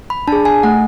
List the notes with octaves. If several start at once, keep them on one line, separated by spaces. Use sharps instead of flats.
B5
D4 G#4 A5
G#5
A3 F#5